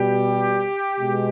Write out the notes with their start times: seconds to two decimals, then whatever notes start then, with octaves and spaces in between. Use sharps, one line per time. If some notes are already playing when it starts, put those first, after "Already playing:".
Already playing: B2 G3 G4
0.99 B2 G#3